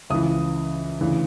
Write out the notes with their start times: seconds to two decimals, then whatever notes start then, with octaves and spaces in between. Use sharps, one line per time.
0.10 C#2 C#3 E3 D#6
1.00 D2 C#3 E3